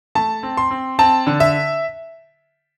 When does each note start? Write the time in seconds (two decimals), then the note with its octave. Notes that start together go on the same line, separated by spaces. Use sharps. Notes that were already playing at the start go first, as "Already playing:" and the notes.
0.15 A3 A5
0.43 C4
0.57 C6
0.71 C4
0.99 C4 A5
1.27 D3
1.40 E5